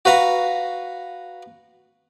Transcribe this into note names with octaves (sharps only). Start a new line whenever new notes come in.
F#4 B4 F5 A#5